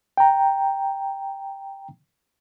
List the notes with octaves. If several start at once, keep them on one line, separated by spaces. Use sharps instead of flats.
G5 A#5